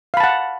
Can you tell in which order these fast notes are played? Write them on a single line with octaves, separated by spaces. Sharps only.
F5 B5 A5 F#5